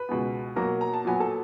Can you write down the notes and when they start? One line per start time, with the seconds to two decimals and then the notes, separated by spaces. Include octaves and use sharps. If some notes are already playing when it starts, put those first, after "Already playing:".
Already playing: B4 B5
0.09 C#2 B2 G#3 B3
0.56 B2 F#3 A#3 A#4 A#5
0.81 A#5
0.94 A5
1.05 A#2 F#3 B3 G#5
1.20 A4 A5